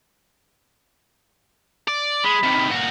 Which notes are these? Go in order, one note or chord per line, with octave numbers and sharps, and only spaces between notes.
D5
G#3 B5
C3 D#3
A#2 F#4